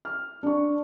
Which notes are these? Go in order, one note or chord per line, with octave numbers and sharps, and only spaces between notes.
F6
D4 C#6